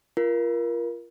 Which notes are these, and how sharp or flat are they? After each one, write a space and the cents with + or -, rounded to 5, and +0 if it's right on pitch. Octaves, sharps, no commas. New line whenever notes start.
F4 -25 A#4 +20